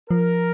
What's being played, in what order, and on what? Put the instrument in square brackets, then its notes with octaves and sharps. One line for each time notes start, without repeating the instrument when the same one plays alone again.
[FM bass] F3 [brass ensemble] A#4